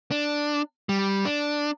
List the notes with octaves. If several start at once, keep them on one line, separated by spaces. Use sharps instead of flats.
D4
G3
D4